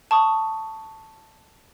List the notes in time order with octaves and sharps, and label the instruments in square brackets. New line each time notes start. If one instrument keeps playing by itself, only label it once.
[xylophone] A5 C#6 D#6